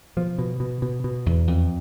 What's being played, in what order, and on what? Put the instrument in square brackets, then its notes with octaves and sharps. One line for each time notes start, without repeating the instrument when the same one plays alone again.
[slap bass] B2 F3
B2
B2
B2
B2
E2
F2